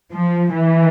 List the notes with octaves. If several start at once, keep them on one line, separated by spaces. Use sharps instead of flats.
F3
E3